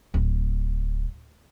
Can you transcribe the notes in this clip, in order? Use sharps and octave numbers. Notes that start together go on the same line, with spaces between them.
D1